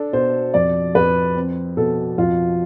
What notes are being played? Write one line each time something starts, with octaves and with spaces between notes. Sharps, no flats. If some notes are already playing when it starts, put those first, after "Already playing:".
Already playing: D4 A4
B2 C5
F2 D5
F2 B4
C4
B2 A4
F2 F4